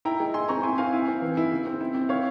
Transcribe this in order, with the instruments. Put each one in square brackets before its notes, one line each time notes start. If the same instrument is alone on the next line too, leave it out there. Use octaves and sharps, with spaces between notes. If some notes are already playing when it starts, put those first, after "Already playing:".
[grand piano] E4 G5 A#5
G#3
E4 G#5 C6
C4 A#5 C#6
E4 G#5 C6
C4 F5 G#5
E4
C4
E3
E4
C#3
C4
E4
C4
E4 C#5 F5